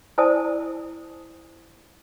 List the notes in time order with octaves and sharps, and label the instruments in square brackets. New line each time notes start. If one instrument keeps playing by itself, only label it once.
[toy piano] E4 C5 D5 G#5 A5 D#6